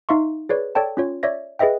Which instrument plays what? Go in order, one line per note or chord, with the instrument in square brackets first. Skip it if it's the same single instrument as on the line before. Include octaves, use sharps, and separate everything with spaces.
[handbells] D#4 E5 F5 C6 C#6
G#4 B4 C#5 D5
A4 C#5 D5 G5 A5
C#4 F4 C#5
C#5 D5 E5 A#6
G#4 B4 D#5 E5 G5